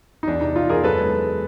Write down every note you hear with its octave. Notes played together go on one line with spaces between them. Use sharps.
D#4
E2 D4
C3 D#4
E2 D#4 F4
E2 G#4 A#4
F#2 A4 B4
G#3
G#3